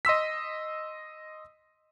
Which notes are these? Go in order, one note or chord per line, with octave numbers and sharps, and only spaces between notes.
D#5 C6 E6 B6